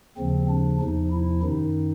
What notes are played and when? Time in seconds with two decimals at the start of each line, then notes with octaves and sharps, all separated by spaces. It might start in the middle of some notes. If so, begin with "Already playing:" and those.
0.17 D#2 C#3 F3 C4
0.49 D4
0.80 E2 C3 F3 D#4
1.12 E4
1.43 F#2 D#3 D#4